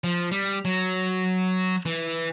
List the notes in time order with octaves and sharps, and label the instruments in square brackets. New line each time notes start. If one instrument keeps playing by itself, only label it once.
[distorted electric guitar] F3
G3
F#3
E3